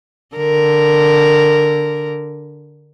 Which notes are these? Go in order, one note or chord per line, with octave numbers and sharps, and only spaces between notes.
D3 A#4